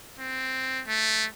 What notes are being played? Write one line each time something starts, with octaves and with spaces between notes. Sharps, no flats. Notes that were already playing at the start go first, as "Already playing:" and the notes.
C4
A3